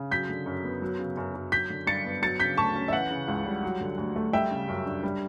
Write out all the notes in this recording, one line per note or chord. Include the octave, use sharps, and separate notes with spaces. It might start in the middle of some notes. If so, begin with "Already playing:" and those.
Already playing: C#3
F#3 G6 B6
D3
F#2
B3
F#3
C#3
F#2
F#2
F#3 G6 B6
D3
G2 A6 C#7
B3
F#3 A6 C#7
C#3 G6 B6
D2 A5 C#6
C#4
E5
E3 F#5
C#3
C#2
G3
F#3
D3
D2
A3
G3 E5 G5
C#3
F#2
D4
G3